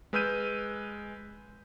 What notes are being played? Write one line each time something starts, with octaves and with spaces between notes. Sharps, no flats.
G#3 B4 E6 F6 G6 D#7